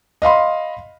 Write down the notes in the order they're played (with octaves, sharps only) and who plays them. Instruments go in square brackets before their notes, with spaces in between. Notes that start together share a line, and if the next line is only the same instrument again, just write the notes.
[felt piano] D#5 F5 B5 C6